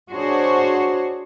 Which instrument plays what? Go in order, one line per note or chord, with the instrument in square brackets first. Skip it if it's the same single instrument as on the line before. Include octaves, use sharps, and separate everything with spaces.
[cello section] D4 F#4 G#4 C5 C#5